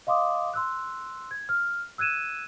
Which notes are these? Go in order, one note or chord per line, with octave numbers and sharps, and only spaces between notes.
D#5 F5 C6 D6 D#6
C6 E6 F#6
G#6
F6
E6 F#6 G#6 D#7 E7